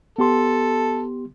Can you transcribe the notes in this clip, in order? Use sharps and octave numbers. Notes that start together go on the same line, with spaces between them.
B3 G4 A4 C6